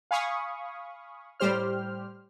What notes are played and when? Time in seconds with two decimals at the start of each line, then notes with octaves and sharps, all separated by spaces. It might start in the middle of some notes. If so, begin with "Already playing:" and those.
0.11 F5 G#5 B5 C#6 D#6
1.40 A2 G3 G4 C5 F6